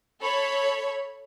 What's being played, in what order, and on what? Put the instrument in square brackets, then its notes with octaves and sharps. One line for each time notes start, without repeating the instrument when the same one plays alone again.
[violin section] A4 C#5 B5